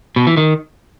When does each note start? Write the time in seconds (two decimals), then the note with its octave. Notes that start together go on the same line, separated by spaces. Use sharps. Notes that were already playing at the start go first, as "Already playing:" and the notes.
0.16 B2
0.27 E3
0.37 D#3